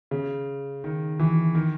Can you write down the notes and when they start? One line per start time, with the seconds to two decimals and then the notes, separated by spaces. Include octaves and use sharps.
0.11 C#3
0.84 D#3
1.19 E3
1.55 D#3